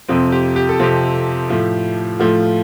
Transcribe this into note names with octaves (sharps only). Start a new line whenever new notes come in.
F2 C3 F3 C4
G4
G4
A4
F2 C3 F3 C4 G4
A2 F3 A3
A2 F3 A3 F4